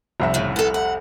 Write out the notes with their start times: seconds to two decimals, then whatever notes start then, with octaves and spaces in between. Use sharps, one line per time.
0.20 F1 C2 E5
0.34 A2 C#3
0.56 B3 A4
0.74 F#5